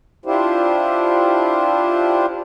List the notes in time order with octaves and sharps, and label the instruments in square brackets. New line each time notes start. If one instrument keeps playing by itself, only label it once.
[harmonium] D4 E4 F4 G4 C5